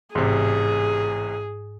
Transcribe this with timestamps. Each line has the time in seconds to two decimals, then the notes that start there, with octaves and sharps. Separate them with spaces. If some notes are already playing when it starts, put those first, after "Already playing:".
0.15 A1 G#2 C3 G#4